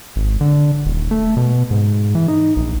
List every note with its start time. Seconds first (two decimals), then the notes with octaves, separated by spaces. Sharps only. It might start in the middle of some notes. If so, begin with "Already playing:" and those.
0.16 G#1
0.41 D3
0.85 D#1
1.11 A3
1.37 B2
1.71 G#2
2.15 E3
2.28 D#4
2.56 A#1